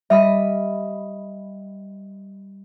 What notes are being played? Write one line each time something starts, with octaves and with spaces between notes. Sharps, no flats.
G3 D#5 E5 B5